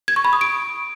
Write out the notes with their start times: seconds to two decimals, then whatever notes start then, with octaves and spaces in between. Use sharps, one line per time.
0.08 G#6
0.16 C#6
0.25 B5
0.33 D#6
0.41 D7